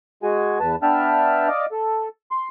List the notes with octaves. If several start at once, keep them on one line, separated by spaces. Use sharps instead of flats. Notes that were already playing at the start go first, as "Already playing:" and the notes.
G#3 F#4 G#4 G#5
E2 B4 A5
B3 D4 E5 G5 A5 F6
D5 D#5 F5 D6
A4
C6